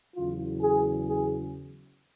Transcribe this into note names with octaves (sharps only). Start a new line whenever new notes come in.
E2 C#3 F#3 F4
G#4
G#4